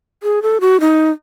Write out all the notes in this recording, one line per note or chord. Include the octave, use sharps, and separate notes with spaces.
G#4
A4
F#4
D#4